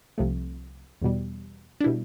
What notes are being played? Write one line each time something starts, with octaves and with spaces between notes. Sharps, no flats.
C2 C3 F3 A3
E2 B2 G3
D4
B2 G3 E4